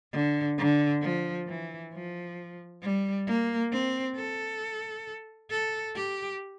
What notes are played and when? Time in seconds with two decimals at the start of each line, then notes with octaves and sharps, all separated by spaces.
0.13 D3
0.58 D3
1.02 F3
1.47 E3
1.93 F3
2.82 G3
3.27 A#3
3.72 C4
4.16 A4
5.51 A4
5.96 G4